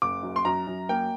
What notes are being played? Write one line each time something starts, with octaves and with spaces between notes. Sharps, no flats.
F#1 D6
F#2
C6
F#2 A#5
F#2
A#3 G5